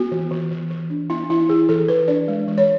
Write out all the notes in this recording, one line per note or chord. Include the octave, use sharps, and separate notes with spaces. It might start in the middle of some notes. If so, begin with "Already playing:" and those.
Already playing: B3 F#4
E3
E3
E3
E3
D4
B3 E4
E3 E4
E3 G#4
E3 A4
E3 B4
D4 D5
G#3
E3
C#5